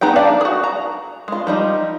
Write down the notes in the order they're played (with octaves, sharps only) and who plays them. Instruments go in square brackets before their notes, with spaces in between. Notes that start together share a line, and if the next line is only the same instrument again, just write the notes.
[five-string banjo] B3 D#4 G#4 G5
D4 D5 F5 A5
F#4 G#4
A#5
G#3 F4
F3 G3 D#4